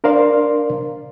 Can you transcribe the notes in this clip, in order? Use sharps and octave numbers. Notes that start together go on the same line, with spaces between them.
D4 A#4 C5 D5 F5 C6